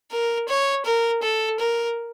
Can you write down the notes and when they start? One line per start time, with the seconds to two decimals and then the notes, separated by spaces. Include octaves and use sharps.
0.12 A#4
0.49 C#5
0.86 A#4
1.23 A4
1.60 A#4